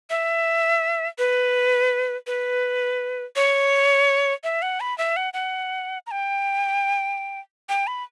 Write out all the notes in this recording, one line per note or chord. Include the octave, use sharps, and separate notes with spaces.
E5
B4
B4
C#5
E5
F#5
B5
E5
F#5
F#5
A#5
G5
G5
B5